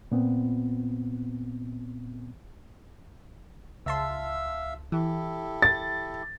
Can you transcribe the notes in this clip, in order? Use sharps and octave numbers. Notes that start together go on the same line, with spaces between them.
A#2 B3 C4
C#2 E5 F5 A5 C6 E6
E3 E4 G4 A4
A6